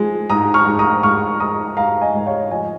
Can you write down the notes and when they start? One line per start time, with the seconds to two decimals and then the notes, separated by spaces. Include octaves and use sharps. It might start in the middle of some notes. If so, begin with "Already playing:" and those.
Already playing: F3 G#3
0.30 G#2 A#5 D#6
0.54 C#6 F6
0.66 G#2
0.79 A#5 D#6
1.03 G#2 C#6 F6
1.40 G#2 A#5 D#6
1.77 G#2 F5 A#5
2.01 D#5 G#5
2.14 G#2
2.26 C#5 F5
2.51 F3 D#5 G#5